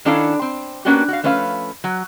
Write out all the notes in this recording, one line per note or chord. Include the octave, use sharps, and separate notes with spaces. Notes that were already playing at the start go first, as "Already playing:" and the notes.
D#3 C#4 D4 E4 A4 F5
C4
A#3 B3 C#4 D4 F#4 G4
F#4 F5
F3 A3 C#4 B4 C#5 F5
F#3